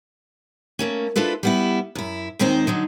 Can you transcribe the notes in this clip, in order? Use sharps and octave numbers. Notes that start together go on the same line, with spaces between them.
A3 A#3 C#4
D4 E4 F4 A4 B4
G3 B3 E4
F#2 E4
D#2 D#3 G#3 C4 D#4 C5
D3 F#3 D#4